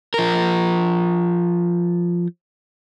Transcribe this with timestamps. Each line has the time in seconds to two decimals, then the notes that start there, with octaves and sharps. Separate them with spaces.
0.14 F3 A#4